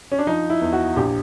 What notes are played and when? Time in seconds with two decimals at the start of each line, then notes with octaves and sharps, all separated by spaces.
0.12 C#4
0.19 D4
0.27 F3 D#4
0.50 E4
0.61 E2
0.73 F#4
0.96 A#1 G4